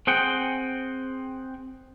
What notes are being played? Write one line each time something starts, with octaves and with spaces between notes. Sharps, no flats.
C4 G#4 F#5 G5